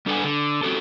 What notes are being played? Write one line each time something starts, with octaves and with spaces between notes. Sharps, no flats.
G3 D4 A4 B4 F#5 G#5
D3
C4 C#4 F#4 G4 A4